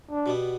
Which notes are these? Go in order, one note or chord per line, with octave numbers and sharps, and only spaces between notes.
D4
B2 G3 B3